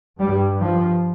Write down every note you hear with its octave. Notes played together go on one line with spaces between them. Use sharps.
G2 G3
F3